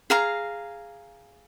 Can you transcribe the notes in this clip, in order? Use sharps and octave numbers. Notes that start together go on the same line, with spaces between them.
G#4 F5 A#5